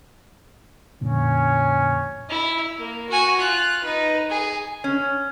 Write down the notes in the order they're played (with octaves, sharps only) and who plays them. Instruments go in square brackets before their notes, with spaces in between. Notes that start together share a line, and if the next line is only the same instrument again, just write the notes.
[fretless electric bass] F2 A#2 D3 [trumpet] C#4
[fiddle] E4
A#3
F#4 G#5
F4 F#6
D#4 B4
G#4
[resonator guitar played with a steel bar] C#4